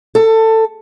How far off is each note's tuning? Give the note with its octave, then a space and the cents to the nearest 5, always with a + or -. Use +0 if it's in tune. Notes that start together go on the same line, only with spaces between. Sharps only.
A4 +20